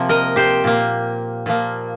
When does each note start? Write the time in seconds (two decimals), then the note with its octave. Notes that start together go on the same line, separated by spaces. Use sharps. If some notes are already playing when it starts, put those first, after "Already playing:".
Already playing: C3 F3 A#3
0.09 A#4 D#5
0.36 G4 C5
0.64 A#2 A#3
1.46 A#2 F3 A#3